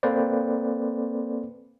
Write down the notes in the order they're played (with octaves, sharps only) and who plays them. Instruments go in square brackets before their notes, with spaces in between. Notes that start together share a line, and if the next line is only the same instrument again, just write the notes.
[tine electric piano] A#3 C4 A4 B4 C5 D5